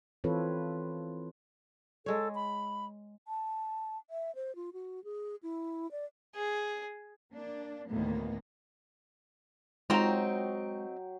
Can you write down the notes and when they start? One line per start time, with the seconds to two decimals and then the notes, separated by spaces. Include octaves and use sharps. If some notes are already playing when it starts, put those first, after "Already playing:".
0.24 E3 C4 F4 A4 B4 C#5
2.06 G#3 A4 C#5
2.35 B5
3.28 A5
4.10 E5
4.35 C5
4.56 F4
4.73 F#4
5.04 G#4
5.43 E4
5.91 D5
6.35 G#4
7.34 A#3 D4
7.89 D2 A2 D#3 A#3 B3
9.90 F#3 G#3 C4 D#4 F4 G5 A#5 C#6